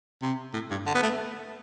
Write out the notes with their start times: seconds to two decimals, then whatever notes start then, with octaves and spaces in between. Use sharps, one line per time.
0.22 C3
0.54 A2
0.71 G2
0.86 D3
0.95 B3
1.03 A3